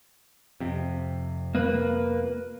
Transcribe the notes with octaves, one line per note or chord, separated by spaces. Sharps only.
F2 C3
A#3 B4